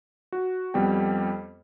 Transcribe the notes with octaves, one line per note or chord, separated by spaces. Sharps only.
F#4
F2 G3 B3 G4 G5